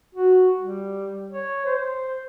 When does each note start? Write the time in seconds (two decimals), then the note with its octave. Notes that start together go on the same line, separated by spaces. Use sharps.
0.15 F#4
0.60 G3
1.31 C#5
1.66 C5